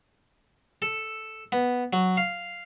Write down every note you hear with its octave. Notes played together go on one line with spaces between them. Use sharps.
A4
B3
F#3
F5